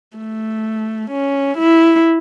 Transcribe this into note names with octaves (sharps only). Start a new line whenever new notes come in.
A3
C#4
E4